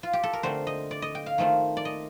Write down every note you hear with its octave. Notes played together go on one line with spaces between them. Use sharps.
F4
G4
A4
A#4
D3 A3 C4 C5
D#5
D5
D#5
G5
F5
D#3 A3 C4 F4
D5
D#5